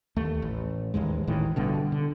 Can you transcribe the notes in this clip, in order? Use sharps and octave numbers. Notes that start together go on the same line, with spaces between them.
D#2 A3
A1
A1 D#2 G#2 G#3
G#1 A2 D#3 E3
G1 G2 B2 D3
D3